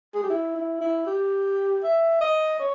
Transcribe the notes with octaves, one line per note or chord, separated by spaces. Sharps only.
G#4
G4
E4
E4
E4
G4
E5
D#5
C#5